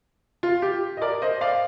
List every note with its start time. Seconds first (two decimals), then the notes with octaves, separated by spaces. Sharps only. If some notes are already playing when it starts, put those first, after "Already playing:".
0.43 F4
0.62 G4
0.97 D#5
1.02 A#4 D5
1.22 C5 D#5
1.41 D5 F5